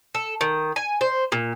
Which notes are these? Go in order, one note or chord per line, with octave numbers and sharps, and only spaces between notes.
A4
D#3
G#5
C5
A#2